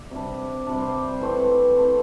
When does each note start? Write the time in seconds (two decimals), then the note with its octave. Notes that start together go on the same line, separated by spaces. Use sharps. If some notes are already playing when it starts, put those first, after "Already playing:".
Already playing: D5 E5
0.11 C3 G3 D4
0.66 C3 G3 D4 D5
0.81 C5
1.08 C5
1.21 E3 A3 C4 B4
1.76 E3 A3 C4